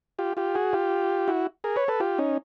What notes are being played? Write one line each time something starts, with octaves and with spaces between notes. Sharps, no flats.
F4 G4
F4 G4
F#4 G#4
F4 G4
E4 F#4
G#4 A#4
B4 C#5
A4 B4
F4 G4
C#4 D#4